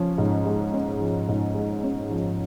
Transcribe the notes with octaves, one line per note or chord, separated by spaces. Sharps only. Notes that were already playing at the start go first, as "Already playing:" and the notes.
Already playing: F3 C#4
G#2
G#3
C#4
F3
G#2
G#3
C#4
F3